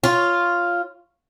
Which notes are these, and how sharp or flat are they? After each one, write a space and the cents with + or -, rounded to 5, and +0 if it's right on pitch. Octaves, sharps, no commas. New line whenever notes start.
F4 +0 C#5 +0